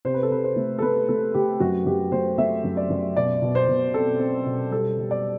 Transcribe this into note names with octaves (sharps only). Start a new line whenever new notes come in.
C3 C5
B4
A4
C3 B4
C5
A3
A4
A3 B4
A3 A4
A3 G4
F#2 F#4
F#2 G4
A3 C5
A3 E5
F#2
D5
F#2
B2 D5
B2
C5
B2
C4 A4
C4
B2
G3 A4
G3
D5